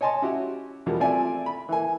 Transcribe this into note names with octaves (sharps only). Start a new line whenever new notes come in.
C#5 D#5 G#5 A5 C6
C#4 E4 F#4 G4
E2 B2 F3 G3 A#4
A3 C4 F4 D5 E5 G#5
B5
E3 A#3 G#5